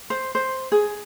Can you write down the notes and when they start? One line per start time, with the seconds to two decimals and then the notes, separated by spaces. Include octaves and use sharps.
0.10 C5
0.35 C5
0.72 G#4